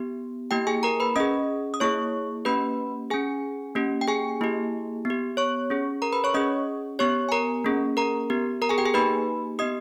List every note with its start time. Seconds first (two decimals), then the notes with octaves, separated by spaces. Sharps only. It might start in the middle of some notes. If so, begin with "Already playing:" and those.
Already playing: B3 G4
0.51 A#3 E4 G4 G5
0.67 G#4 G#5
0.83 A#4 A#5
1.00 B4 B5
1.16 C#4 G#4 D#5 D#6
1.74 D#6
1.80 A#3 E4 G#4 C#5 C#6
2.45 A#3 C#4 G4 B4 B5
3.10 C#4 G#4 G#5
3.75 A#3 C#4 G4
4.01 G5
4.08 G#4 G#5
4.41 A#3 E4 G4
5.05 B3
5.10 G4
5.37 C#5 C#6
5.70 C#4 G#4
6.02 A#4 A#5
6.13 B4 B5
6.24 C#5 C#6
6.34 C#4 G#4 D#5 D#6
6.99 B3 G4 C#5 C#6
7.29 G#5
7.32 A#4 A#5
7.64 A#3 C#4 G#4
7.97 A#4 A#5
8.30 B3 G4
8.62 A#4 A#5
8.69 G#4 G#5
8.78 G4 G5
8.86 G#4 G#5
8.94 A#3 D#4 G4 B4 B5
9.59 B3 G4 D#5 D#6